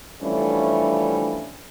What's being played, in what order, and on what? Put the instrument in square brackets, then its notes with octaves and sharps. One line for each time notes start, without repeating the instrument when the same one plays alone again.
[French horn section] E3 F3 G3 A3 C#4 D4